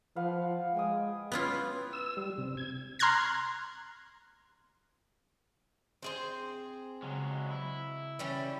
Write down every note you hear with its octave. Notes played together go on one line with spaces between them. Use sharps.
F3 B4 F5 F#5
G#3 G5 G#5 D#6
B3 C#4 E4 F4
E6
G3
C3
G#6
A#5 C6 F6 F#6 G#6 A#6
C4 G#4 C5
C#3 F#3 G#3
E4
E3 G3 C#4